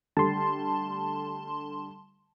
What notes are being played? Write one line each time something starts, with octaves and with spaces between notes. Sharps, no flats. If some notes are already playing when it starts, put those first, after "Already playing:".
D3 G3 A3 A5 C6